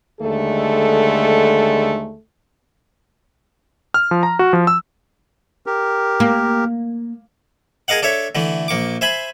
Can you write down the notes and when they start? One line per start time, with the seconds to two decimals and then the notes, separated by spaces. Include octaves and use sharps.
0.20 D#2 D3 G#3 A3 A4
3.94 F6
4.11 F3
4.23 A#5
4.39 F#4
4.53 F3
4.67 E6
5.66 G4 A#4
6.20 A#3
7.88 G#4 A#4 D#5 F5 F#5
8.03 D4 A4 C#5 E5
8.35 D3 E3 A3
8.68 A#1 A#3 C#6 D6
9.01 C5 E5 G#5 B5 C6